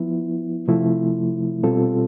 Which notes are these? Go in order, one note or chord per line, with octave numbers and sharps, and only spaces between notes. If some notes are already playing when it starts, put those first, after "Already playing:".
Already playing: F3 B3 E4
C3 F3 A3 E4
B2 G3 C4 F4 A4